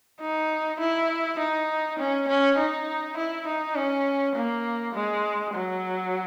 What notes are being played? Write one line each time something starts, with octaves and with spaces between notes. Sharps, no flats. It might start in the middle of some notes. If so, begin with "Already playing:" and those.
D#4
E4
D#4
C#4
C#4
D#4
E4
D#4
C#4
A#3
G#3
F#3